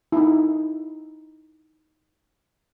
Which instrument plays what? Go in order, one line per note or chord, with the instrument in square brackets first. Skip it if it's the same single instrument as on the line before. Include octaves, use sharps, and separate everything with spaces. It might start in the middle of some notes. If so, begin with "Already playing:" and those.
[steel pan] D#4 E4